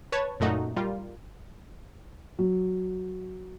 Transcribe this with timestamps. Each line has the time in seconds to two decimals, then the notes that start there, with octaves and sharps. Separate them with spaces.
0.12 B4 C#5 A5 G#6
0.40 F#2 A#2 A3 D#4 F#4
0.76 G3 F4 A#4
2.39 F#3